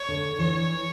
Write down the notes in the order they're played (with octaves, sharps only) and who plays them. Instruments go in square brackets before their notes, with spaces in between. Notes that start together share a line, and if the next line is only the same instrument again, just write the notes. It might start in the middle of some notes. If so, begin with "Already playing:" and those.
Already playing: [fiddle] C#5
[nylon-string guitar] D3
[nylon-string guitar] E3 [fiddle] C#5